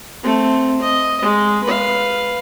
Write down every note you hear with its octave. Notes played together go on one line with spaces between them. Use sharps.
A3 C4
D#5
G#3
B4 F5